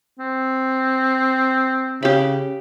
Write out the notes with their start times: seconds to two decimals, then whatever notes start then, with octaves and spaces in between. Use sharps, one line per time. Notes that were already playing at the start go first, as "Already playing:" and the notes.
0.19 C4
2.03 C#3 G4 B5